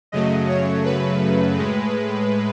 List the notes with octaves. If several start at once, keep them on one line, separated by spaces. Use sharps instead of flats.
F#2 C#3 F#3 A3 D#5
C#5
B4
A2 G#3